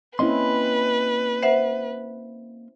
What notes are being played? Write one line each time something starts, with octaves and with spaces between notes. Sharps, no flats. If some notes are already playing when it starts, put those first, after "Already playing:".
A#3 C4 C#4 E4 B4 D#5 C6
C5 E5 F#5